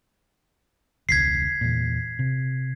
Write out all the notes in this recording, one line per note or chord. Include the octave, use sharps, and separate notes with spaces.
E1 C#2 G#6 B6 C7
E2 A#2
C3